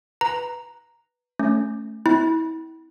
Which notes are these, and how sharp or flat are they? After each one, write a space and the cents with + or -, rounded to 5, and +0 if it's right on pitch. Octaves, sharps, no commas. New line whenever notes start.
B4 +0 A#5 +0
A3 +0 C#4 +0
C4 -35 E4 -30